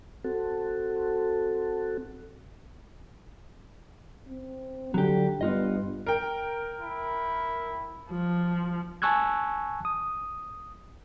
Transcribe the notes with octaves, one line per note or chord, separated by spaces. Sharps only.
C4 F#4 A4
C4
D3 F#3 G4
G2 B3 F4 D#5
A#4 G5
E4
F3
G#5 A5 C#6 E6 F#6 G#6
D#6